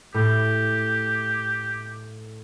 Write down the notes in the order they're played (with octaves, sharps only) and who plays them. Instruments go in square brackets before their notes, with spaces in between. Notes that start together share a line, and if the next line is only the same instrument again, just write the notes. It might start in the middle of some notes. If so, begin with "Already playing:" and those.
[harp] A2 [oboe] G4